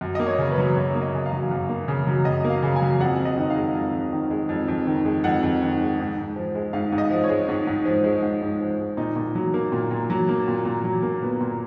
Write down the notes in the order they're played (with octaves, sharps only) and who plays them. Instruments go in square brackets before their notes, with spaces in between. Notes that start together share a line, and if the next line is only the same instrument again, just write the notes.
[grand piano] F#2
A#3 D#5
C#5
C#3
B4
F#3
F#2 C#5
A#3
D#5
C#3
F5
F#3
F#2
A#3
C#3
F#3
F#2 D#5
A#3
F5
C#3
G#5
F#3
F2 F#5
F2
D#5
D#3
F5
G#3
F2
F2
D#3
G#3
F2
F2
D#3
G#3
F2 F#5
F2
D#3
G#3
G#2
G#2
F3
G#3
G#2 F5
G#2
D#5
F3
C#5
G#3
G#2
G#2
F3
G#3
G#2
G#2
F3
G#3
A#2 D#4
A#2
F#3
A#3
A#2
A#2
F#3
A#3
A#2
A#2
F#3
A#3
A#2 B3
A#2